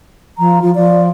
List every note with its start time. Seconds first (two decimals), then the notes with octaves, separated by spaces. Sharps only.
0.38 F3 A#5
0.62 F3 F4
0.75 F3 D5